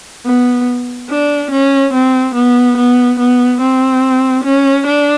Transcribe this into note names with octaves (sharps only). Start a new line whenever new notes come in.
B3
D4
C#4
C4
B3
B3
B3
C4
C#4
D4